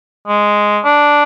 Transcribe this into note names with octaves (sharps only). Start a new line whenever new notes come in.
G#3
D4